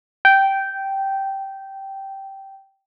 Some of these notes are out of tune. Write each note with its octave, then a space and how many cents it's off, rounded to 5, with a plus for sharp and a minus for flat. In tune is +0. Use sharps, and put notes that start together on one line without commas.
G5 -10